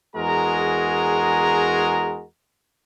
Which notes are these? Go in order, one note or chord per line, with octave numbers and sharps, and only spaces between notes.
E2 G#3 F#4 G#4 A#4 A#5